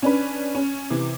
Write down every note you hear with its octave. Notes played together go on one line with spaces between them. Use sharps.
C#4 D4 B4
C#4
C3 E3